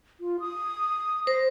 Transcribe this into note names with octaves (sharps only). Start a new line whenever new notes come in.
F4
D#6
C5 A#6